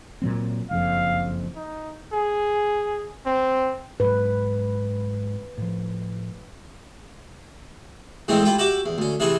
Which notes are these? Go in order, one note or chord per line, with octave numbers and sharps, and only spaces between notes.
A#2 F#3 C4
F#1 F2 F5
D#4
G#4
C4
G#2 F#3 B4
A2 F3
E2 A2 E3 G#3 A3 C4
E4 F4 G4 G5
F#4 G4 E5 D6
E2
D2 C#4
C3 E3 G#4 B4 C#6